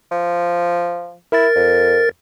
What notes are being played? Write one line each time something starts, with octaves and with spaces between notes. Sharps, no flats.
F3
E4 A#4 A6
F2